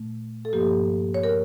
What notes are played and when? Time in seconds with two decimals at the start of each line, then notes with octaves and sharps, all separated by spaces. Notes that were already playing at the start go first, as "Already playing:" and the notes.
Already playing: A#2 A3
0.45 A4
0.53 G2 F3 A#3 G4
1.14 C#5
1.23 A#4